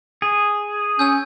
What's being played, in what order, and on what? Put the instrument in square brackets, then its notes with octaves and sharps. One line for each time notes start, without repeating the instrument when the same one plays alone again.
[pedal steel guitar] G#4
[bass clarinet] C#4 [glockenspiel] G#5 E6 G6